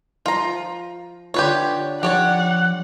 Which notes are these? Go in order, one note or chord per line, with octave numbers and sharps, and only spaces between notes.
F3 F4 A#5
D3 F4 G4 B4 C#5
F3 G4 C#5 D5 F#5